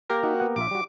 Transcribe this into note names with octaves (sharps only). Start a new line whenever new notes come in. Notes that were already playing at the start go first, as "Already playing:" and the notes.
A#3 G4 A#4
D#4 F#4
B3 F#5
A#1 F4 E5 D6
G3 F#4